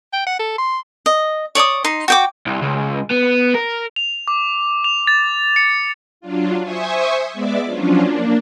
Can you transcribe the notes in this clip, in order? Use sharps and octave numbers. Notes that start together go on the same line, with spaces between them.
G5
F#5
A4
C6
D#5
C#5 D5 D6 D#6
D#4 C6
F#4 G5 D6
C2
C#2
B3
A#4
F7
D6
F7
A6
C#7
F#3 D4 F4
C5 E5 G#5 C#6 D#6
G#3 B3 D5 E5 D6
F3 F#3 C#4 D4 F4
A#3 D4